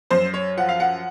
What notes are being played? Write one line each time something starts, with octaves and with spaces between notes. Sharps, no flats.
F#2 C5
C#5
F3 F#5
F5
F#5